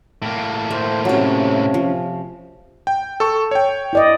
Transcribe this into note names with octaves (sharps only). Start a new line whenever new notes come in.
A2 A#3
A3 C5
C3 F#3 C#4
F3
G5
A4 C#6
C#5 G5
E4 D5 D#5